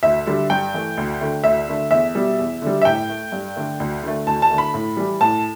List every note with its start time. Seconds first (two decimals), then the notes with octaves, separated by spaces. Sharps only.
0.03 D2 E5
0.26 D3 G3
0.50 G2 G5
0.74 E3 A3
0.97 D2
1.21 D3 A3
1.44 D2 E5
1.68 D3 A3
1.91 E2 E5
2.15 B2 G3
2.39 E2
2.62 D3 G3
2.82 E5
2.85 A2 G5
3.09 A3
3.32 G2
3.56 D3 A3
3.80 D2
4.03 D3 A3
4.27 D2 A5
4.42 A5
4.50 D3 A3
4.58 B5
4.74 A2
4.97 E3 G3
5.21 A2 A5